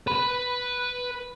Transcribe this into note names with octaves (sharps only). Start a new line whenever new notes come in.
B4 B5